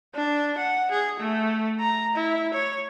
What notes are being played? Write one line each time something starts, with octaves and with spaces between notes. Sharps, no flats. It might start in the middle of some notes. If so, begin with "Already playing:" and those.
D4
F#5
G#4
A3
A#5
E4
C#5